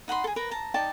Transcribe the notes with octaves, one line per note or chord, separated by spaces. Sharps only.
D#4 F#5 B5 C6
G#4 A4
A#4 B4 A#5
A5 A#5
D#4 D5 G5 A5